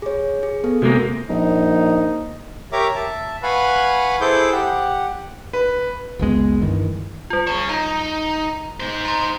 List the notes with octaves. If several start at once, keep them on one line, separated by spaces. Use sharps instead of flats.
G#4 C#5
G#4
B3 A4
C3 G#3 A#3 F#4
A#1 D#4
G4 A#4 C#5 E5 A#5 D6
E5 A5
B4 F5 F#5 G#5 B5 C#6
E4 G#4 A4 C5 D6 G6
G4 F#5
B4
F#1 C#2 G#3 B3
G2 D#3 E3
G3 F4
G#4 C#5 E7
D#4 A#5
D#4 C5
A#5 C6